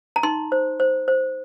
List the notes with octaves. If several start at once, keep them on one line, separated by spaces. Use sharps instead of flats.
A#5
D#4 C6
C5
C5
C5